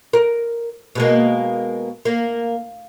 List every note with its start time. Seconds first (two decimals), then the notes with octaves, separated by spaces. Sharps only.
0.13 A#4
0.95 B2 G#3 A#3
2.05 A#3